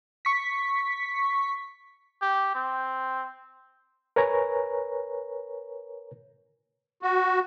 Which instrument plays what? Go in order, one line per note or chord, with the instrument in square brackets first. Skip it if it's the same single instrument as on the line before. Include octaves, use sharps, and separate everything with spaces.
[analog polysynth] C#6 B6
[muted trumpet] G4
C4
[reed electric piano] A#4 B4 C#5 G#5 A#5
[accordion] F#4